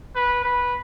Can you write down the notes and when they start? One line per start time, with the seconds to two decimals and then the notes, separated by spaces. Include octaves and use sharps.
0.16 B4
0.44 B4